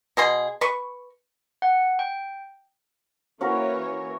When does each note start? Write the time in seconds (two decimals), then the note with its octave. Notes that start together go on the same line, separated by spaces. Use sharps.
0.17 B2 G#4 C6
0.61 B4 C#6
1.62 F#5
1.99 G5
3.41 E3 A#3 C#4 F#4 A#4 C#5